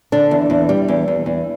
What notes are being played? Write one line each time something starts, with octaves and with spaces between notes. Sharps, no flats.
D3 D4
E2
E2
G3
E2
E2
E2